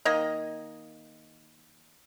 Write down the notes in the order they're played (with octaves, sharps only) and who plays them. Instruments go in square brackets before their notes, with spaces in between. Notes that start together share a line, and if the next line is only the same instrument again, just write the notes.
[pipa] D#3 A#3 D#5